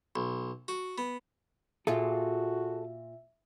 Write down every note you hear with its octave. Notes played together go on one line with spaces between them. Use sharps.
B1
F#4
B3
A#2 F4 F#4 G#4 A4 E5